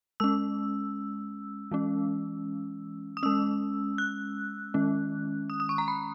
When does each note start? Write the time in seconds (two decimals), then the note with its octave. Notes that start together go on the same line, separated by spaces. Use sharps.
0.20 G#3 C#4 E6
1.71 E3 G#3 C#4
3.17 D#6
3.23 G#3 C#4 E6
3.98 F#6
4.74 D#3 G#3 C#4
5.50 D#6
5.60 D#6
5.69 C#6
5.78 A#5
5.88 B5